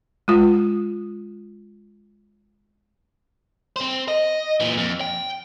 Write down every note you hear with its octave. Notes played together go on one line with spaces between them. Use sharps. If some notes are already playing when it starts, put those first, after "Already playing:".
G#3 F4
C4 C5
D#5
A#2 E3
F2
G5